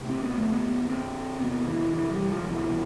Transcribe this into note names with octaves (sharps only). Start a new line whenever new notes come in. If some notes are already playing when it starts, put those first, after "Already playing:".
Already playing: D2 C3
C4
B3
F2 D3 A3
B3
C4
E2 C3 B3
E3
E3
G3
F3
C2 B2 E3